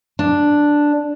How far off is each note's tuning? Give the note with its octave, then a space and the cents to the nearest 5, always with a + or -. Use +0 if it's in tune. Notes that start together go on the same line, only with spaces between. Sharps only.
D4 +0